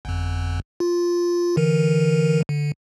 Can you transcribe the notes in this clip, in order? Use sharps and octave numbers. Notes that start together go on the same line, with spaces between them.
G1 F2
F4
D3 E3 A#4
D3